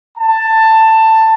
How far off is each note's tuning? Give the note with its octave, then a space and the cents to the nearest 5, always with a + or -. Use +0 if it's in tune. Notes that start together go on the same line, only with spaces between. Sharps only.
A5 +15